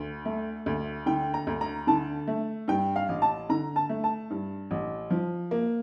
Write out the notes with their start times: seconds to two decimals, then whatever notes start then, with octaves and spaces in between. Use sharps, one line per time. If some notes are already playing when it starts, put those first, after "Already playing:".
Already playing: D2
0.25 A3
0.66 D2
1.06 D3 G5
1.34 A#5
1.47 D2
1.61 A#5
1.87 D3 A5
2.28 A3
2.68 G2 G5
2.96 F5
3.09 A1
3.22 A5
3.49 D3 A#5
3.76 A5
3.89 A3
4.04 A5
4.30 G2
4.71 A1
5.10 F3
5.51 A#3